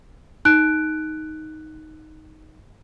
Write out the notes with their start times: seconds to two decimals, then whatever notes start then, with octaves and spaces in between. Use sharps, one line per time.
0.45 D#4 F#6 D7